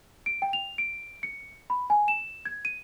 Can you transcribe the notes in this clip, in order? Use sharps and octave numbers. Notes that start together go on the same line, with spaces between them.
D7
G5
F7
D7
C#7
B5
G#5
E7
G#6
D#7